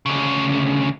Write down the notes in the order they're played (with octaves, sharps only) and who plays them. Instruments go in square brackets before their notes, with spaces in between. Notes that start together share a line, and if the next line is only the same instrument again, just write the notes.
[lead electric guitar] D2 C#3